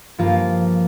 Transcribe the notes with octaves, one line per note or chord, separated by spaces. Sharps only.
G2 F3 A#3 F4